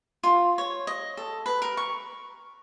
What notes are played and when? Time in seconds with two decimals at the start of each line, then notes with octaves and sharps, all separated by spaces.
0.23 F4
0.58 C#5
0.87 D#5
1.17 A4
1.46 B4
1.62 A#4
1.77 C#6